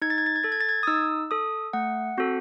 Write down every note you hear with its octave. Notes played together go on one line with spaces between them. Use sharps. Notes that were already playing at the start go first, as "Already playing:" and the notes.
D#4 G#6
A6
G#6
A6
G#6
A4 A6
G#6
A6
G#6
D#6
D#4 E6
A4 D#6
A3 F#5
C4 F#4 A4